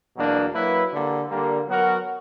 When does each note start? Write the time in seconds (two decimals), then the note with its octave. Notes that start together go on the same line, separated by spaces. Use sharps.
0.16 E2 B2 F#3 A#3 D4
0.53 F#3 A#3 E4 B4
0.91 D3 G3 A#3
1.29 D3 G3 A#3
1.67 F#3 B3 F#4 A#4